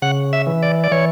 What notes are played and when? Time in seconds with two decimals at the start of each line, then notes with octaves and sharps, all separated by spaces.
0.02 C#3 F#5
0.33 E5
0.47 E3
0.63 D5
0.84 D5
0.92 E3 C#5